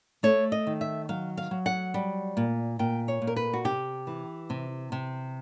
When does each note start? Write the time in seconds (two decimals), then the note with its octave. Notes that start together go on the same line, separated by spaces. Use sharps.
0.23 A3 C#5
0.52 D#5
0.67 D#3
0.81 E5
1.09 F#3 F5
1.37 F5
1.51 F#3
1.66 F#5
1.94 G3
2.37 A#2
2.79 A#2 G5
3.08 C#5
3.22 A#2
3.27 A#4
3.36 B4
3.53 F#4
3.65 C3 G4
4.07 E3
4.50 C3
4.92 C3